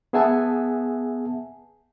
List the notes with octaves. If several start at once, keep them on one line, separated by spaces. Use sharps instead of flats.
B3 G#4 E5 F#5 G#5 A5